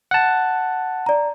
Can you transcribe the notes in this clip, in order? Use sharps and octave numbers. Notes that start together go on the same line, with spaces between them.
F#5 A5
D5 A#5